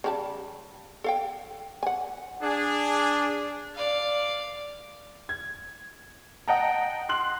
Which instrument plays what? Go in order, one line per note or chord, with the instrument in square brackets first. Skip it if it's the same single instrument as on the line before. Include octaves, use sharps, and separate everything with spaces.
[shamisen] C#3 G3 A5
A4 F5 G5
F#5 G#5
[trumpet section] D4 G#4
[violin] D5 F5
[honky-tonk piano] G#6
D#5 F#5 G5 A5 A#5
C6 F#6 F#7